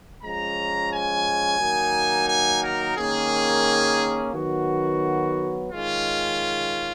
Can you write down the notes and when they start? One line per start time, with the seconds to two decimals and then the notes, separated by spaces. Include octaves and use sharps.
0.23 F3 G#3 C#4 A#5
0.92 G#5
1.60 D#3 F#3 A#3 D#4
2.29 G#5
2.63 A#4
2.97 D#3 A#3 C#4 G#4
4.34 D#3 F#3 B3 F#4
5.70 D#3 G#3 C#4 F4